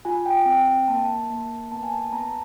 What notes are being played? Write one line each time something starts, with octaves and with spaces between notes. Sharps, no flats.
F4 G#5
G5
C4 G5
G5
A#3 A5
A#3
B3 A5
G#5
A5
B3 A#5
A5